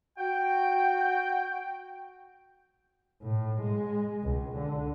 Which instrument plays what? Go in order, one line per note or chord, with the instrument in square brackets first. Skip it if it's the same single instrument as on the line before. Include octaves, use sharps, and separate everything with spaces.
[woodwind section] F#4 G5
[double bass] A2
G#3
C#2
D3